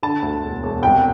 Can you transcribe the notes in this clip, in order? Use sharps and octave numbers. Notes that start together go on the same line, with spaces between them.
D3 A5
D2
E1
E1
C2 G5